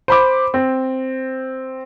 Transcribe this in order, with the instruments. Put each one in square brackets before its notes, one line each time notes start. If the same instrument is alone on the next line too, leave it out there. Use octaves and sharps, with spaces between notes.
[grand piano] C5 B5 D6
C4